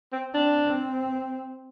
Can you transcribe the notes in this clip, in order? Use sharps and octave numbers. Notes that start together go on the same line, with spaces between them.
C4
C4 D4
C4